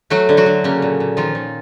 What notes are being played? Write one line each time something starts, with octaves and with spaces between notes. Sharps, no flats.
F#3 A3 F#4
D3
F#3 F#4
D3
C#3 A#3 C#4
A#2
A#2
D#3 F3 F4
D#3